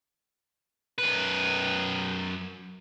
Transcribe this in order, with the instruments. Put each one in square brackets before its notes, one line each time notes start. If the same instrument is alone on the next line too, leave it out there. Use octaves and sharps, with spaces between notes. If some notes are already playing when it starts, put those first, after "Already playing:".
[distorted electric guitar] F#2 B4